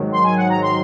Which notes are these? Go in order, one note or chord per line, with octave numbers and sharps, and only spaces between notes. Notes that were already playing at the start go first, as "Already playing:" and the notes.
Already playing: G#2 D#3 F#3
C6
G#5
F#5
A#5
C6